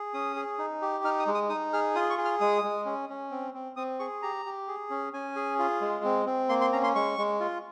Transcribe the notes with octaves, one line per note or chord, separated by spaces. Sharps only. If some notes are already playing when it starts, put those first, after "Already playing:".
Already playing: G#4
C#4 D#6
G#4
D#4
G4
D#4 F6
D#6
G#3
D#6
D#4 D#6
G#4 F6
F4 D#6
C#6
G#4
F6
G#3 D#6
G#3
C#4
C#4
C4
C4
C4 D#6
G#4 C#6
G4 A#5
G4
G#4
C#4
C#4 G#5
G#4
F4
G#3
C4
C4
A#3 C6
C6
C#4 A#5
C6
G#3 C#6
G#3
F4